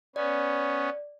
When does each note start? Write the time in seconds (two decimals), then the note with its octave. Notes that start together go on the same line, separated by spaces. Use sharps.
0.16 B3 C#4 D5